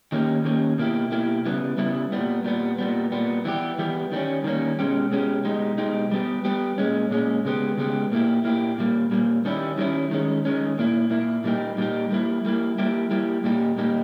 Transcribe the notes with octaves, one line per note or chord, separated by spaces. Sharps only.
D#3 A#3 C#4 G4
D#3 A#3 C#4 G4
B2 A#3 E4 G4
B2 A#3 E4 G4
C#3 G3 B3 E4
C#3 G3 B3 E4
A#2 G3 B3
A#2 G3 B3
A#2 G3 B3
A#2 G3 B3
E3 G3 B3 G4
E3 G3 B3 G4
D#3 G3 A#3 C#4
D#3 G3 A#3 C#4
B2 G#3 C#4 G4
B2 G#3 C#4 G4
B2 G#3 D#4 G4
B2 G#3 D#4 G4
G3 B3 G4
G3 B3 G4
A#2 G#3 C#4
A#2 G#3 C#4
C#3 G#3 B3 G4
C#3 G#3 B3 G4
A#2 A#3 E4 G4
A#2 A#3 E4 G4
A#2 G3 A#3
A#2 G3 A#3
D#3 G3 C#4 E4
D#3 G3 C#4 E4
D#3 G#3 C#4
D#3 G#3 C#4
A#2 A#3 E4
A#2 A#3 E4
A#2 G3 A#3 D#4 G4
A#2 G3 A#3 D#4 G4
G3 A#3 E4
G3 A#3 E4
G3 A#3 E4 G4
G3 A#3 E4 G4
A#2 G3 A#3 D#4 G4
A#2 G3 A#3 D#4 G4